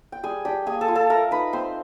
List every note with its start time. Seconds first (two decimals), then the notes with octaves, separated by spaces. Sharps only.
0.12 G5
0.23 G3 G#4 G#5
0.45 D4 G4 G5
0.66 A#3 G#4 G#5
0.81 A4 A5
0.88 F4
0.95 A4 A5
1.10 A3 A#4 A#5
1.31 D#4 B4 B5
1.53 C4 C5 C6